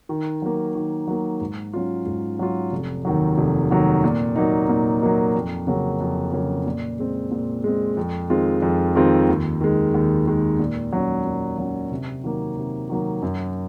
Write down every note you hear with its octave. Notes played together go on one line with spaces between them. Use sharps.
D#3
F#3 A#3
D#3
F#3 A#3
G#2
F#3 C#4 F4
G#2
F#3 C#4 F4
F1
D#2 D#3 F#3
F1
D#2 D#3 F#3
A#2
F#3 A#3 D#4
A#2
F#3 A#3 D#4
F2
C#3 F#3 A#3 C#4
F2
C#3 F#3 A#3 C#4
A#2
G#3 C4
A#2
G#3 C4
F2
D#3 G#3 C4 F4
F2
D#3 G#3 C4 F4
D#2
D#3 G#3
D#2
D#3 G#3
A#2
F#3 C#4
A#2
F#3 C#4
C3
D#3 F#3 A#3
C3
D#3 F#3 A#3
F#2